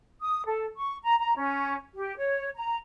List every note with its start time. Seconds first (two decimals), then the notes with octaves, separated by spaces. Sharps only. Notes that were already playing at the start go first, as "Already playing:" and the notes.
0.21 D#6
0.46 A4
0.77 C#6
1.03 A#5
1.18 A#5
1.37 C#4
1.95 G4
2.17 C#5
2.55 A#5